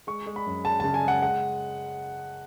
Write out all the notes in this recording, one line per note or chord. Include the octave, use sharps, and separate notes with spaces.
G#3 C#6
G#3
B5
F#2
G#3 A5
C#3 A5
G#5
G#3 F#5
G#3 F#5